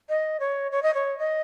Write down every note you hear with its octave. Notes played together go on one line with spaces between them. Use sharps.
D#5
C#5
C#5
D#5
C#5
D#5